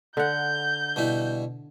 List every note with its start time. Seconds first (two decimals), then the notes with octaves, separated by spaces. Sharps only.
0.17 D3 F#5 G6
0.96 B2 G3 E4